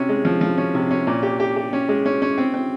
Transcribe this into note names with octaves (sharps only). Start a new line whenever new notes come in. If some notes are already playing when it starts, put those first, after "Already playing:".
Already playing: C3 C#4
G#3
F3
F3
C#4
C3
C#4
A#2
G4
G4
G4
C#4
G#3
C#4
C#4
C4
C4